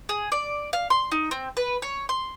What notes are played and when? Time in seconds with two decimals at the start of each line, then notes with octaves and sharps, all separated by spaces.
0.09 G#4
0.32 D5
0.73 F5
0.90 C6
1.12 D#4
1.31 C4
1.57 B4
1.82 C#5
2.09 C6